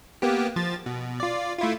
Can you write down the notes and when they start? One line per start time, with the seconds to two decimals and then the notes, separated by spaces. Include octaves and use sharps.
0.22 A#3 B3 G4
0.56 F3 A6
0.86 B2
1.20 F4 D5
1.59 A3 E4 F4